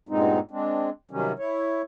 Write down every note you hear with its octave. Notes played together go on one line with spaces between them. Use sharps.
G2 A#2 G#3 B3 C4 D#4
G#3 C4 D4
C3 D#3 F#3 G3 C#4
E4 C#5